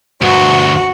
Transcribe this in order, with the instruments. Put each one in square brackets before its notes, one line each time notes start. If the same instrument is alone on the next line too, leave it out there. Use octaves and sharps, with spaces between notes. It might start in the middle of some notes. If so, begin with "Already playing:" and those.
[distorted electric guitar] D2 G2 [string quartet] F#4